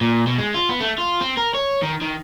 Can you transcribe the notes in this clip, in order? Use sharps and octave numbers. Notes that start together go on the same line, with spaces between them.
A#2
B2
G#3
F4
B3
A3
F4
C4
A#4
C#5
D#3
D#3